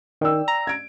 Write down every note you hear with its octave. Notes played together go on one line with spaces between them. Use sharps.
D#3 D5 G5 E6
A#5
G#6 D7